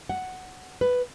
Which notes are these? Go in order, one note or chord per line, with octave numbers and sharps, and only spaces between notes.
F#5
B4